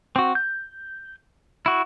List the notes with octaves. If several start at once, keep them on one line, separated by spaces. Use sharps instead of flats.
C4 F#4
G6
E4 F#4